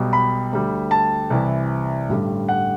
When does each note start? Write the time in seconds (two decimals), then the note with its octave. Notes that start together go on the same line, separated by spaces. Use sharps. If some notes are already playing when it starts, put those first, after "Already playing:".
Already playing: B1 B2 G3
0.13 B5
0.52 D2 D3 G3
0.91 A5
1.30 C2 C3 E3
2.09 A1 G2 D3 G3
2.49 F#5